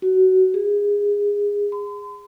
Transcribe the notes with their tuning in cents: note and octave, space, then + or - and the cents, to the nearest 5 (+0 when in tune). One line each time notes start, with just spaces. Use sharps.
F#4 +20
G#4 -20
C6 -45